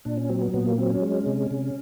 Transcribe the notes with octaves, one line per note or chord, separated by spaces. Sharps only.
A#2 D4
C#4
F#3 C4
B3
A#2 B3
A#3
F#3 C4
C#4
G#3
C3
C3